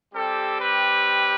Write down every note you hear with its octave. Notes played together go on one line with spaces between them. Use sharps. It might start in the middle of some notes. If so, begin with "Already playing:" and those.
G3 C4 G4 A4
B4